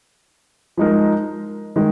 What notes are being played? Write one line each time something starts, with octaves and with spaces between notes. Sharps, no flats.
F3 G#3 D#4 A#4
D#3 G#3